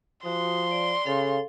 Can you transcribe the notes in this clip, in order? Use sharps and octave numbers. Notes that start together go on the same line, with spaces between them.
F3 F#4 C6 D#6
D5
C#3 A4 F5